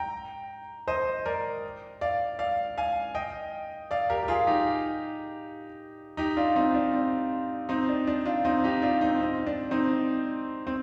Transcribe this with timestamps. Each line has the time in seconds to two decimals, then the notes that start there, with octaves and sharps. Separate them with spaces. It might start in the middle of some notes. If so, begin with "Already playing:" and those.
Already playing: G5 A#5
0.88 C5 D#5
1.26 A#4 D5
2.01 D5 F5
2.39 D5 F5
2.78 F5 G#5
3.15 D#5 G5
3.91 D5 F5
4.10 G4 A#4
4.23 G4
4.28 F4 G#4
4.47 D#4 G4
6.17 D#4 G4
6.37 D4 F4
6.56 C4 D#4
6.74 D4
6.93 C4
7.69 C4 D#4
7.88 D4
8.07 D4
8.25 D4 F4
8.45 C4 D#4
8.64 D#4 G4
8.82 D4 F4
9.01 C4 D#4
9.21 C4
9.47 D4
9.71 C4 D#4
10.67 C4